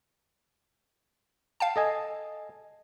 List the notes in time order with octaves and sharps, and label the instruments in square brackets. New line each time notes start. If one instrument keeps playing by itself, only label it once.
[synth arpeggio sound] F5 G5 A5
[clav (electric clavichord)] A4 D#5 G#5